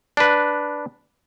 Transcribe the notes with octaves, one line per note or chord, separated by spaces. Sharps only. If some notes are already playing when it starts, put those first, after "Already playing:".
D4 B4